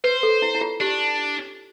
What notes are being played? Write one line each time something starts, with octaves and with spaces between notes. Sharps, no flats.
B4 C5
A4
E4
E4
F4
D4 G4